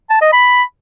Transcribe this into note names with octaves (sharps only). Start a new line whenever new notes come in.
A5
D#5
B5